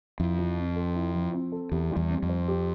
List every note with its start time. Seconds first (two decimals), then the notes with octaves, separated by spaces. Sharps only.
0.20 F2 E4
0.38 F3
0.57 C4
0.76 A4
0.95 E4
1.14 F3
1.33 C4
1.52 A4
1.72 E2 G4
1.91 G3
1.96 E2
2.09 C4
2.23 F2
2.29 C5
2.48 G4